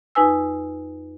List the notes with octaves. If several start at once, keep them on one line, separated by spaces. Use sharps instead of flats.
F2 D#4 B4 G#5 E6